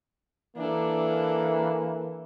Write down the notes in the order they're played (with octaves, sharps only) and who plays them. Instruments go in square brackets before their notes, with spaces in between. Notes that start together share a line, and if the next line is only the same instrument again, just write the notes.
[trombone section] E3 A#3 [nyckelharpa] D4 A4